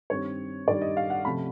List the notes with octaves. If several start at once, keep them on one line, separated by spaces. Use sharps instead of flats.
G2 D#3 G3 C4 C#5
G2 D#3 G3 C4 D5
D#5
F5
F#5
C3 F3 A3 C#4 B5